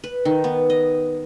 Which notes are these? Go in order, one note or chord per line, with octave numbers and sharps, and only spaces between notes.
B4
D#3
B3
D#5